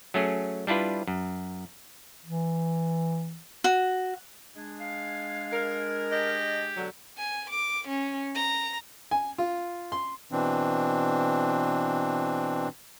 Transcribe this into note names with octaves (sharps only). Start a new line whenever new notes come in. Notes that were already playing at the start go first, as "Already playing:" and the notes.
F#3 A3 C#4 G#4
G3 D4 E4 F4 B4
F#2
E3
F#4
G#3 D4 G#4
F5
A#4
G4 D#5
B2 D3 F#3
G#5
D6
C#4
A#5
G#5
F4
C6
B2 E3 C4 D4